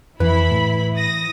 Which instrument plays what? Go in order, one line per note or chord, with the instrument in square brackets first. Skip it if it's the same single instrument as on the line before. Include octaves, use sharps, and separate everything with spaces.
[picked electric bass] F2 [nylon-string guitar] E3 [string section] E4 B5 [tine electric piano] B4
[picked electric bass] A2
[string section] D#6 A#6